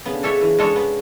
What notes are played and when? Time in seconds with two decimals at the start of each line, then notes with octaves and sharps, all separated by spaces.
0.05 C#3 B3
0.13 D3
0.20 C#3 D4 A4 C#5 E5
0.41 E3
0.59 G#3 D4 A4 C#5
0.76 B3